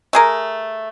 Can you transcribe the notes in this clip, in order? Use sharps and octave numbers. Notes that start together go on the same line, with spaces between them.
A3 G#4 A#4